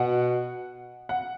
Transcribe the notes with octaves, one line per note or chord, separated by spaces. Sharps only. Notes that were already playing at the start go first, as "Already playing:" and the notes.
Already playing: B2 F#5
F#5